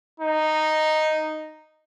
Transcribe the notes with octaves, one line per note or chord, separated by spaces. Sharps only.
D#4